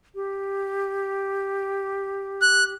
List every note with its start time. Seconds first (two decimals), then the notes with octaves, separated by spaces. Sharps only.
0.15 G4
2.42 F#6